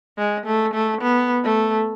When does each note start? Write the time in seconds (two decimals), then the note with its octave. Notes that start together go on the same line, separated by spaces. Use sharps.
0.18 G#3
0.46 A3
0.74 A3
1.02 B3
1.45 A3